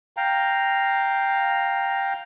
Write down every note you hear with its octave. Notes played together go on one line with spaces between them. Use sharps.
F5 G5 A#5